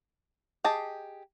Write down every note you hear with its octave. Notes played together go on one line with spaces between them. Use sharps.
G4 G#4 D#5 A5